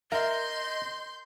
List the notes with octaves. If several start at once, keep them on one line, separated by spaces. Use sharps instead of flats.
A#4 D#5 E5 C6 G6